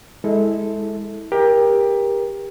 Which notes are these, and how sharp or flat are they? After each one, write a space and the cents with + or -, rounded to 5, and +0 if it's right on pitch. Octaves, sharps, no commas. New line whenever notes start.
G#3 +0 E4 -25 A4 +0
G4 +20 A#4 +20